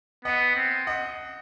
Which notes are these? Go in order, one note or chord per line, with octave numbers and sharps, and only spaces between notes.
B3 D#5 F#5
C4
D#5 F#5